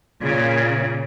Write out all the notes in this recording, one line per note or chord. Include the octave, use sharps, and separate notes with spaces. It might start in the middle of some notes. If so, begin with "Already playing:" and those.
A#2 C#3